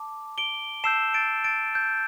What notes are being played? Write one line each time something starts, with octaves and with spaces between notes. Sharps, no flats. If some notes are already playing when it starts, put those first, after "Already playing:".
Already playing: A5 D6
D7 G7
A5 E6 G6 C7 E7
A6 D7
A6 D7
G6